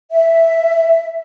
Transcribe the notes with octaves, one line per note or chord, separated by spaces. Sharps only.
E5